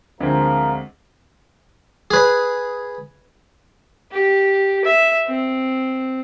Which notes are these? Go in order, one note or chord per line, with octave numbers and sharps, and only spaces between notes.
D2 F3 G#3 C4 A#4
G#4 B4
G4
E5
C4